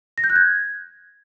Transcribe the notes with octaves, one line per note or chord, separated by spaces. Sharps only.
A#6
G6
F#6
G#6